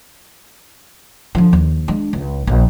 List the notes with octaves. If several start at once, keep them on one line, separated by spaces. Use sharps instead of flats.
D3 F3
D#2
G#3 D4
C#2
A#1